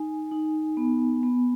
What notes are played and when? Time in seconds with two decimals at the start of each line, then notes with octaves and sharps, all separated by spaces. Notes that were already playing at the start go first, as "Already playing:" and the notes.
Already playing: D#4 G#5
0.31 D#4
0.77 B3
1.23 B3